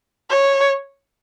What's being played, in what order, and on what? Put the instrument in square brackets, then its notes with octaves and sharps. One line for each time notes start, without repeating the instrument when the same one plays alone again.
[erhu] C#5